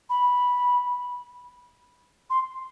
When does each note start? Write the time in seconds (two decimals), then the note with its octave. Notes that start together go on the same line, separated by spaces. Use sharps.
0.10 B5
2.30 C6